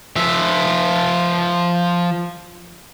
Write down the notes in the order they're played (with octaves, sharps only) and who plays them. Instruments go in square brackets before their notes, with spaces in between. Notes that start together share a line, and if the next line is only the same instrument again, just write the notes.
[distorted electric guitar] F3 E5